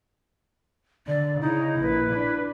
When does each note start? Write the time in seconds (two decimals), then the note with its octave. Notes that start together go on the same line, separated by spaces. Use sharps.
1.07 D3 D5
1.41 C#3 D#4 E4
1.81 A#1 B4
2.12 D4